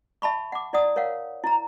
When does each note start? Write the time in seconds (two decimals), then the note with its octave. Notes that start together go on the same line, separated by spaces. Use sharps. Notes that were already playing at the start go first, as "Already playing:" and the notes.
0.22 E5 A5 B5 C#6
0.52 F#5 D6
0.73 E4 D5 F#5 D#6
0.96 A#4 C#5 F5 F#5
1.44 E4 A#5